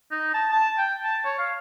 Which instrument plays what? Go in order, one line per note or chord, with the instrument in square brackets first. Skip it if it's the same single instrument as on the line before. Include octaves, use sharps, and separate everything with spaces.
[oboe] D#4
A5
A5
G5
A5
C#5
F5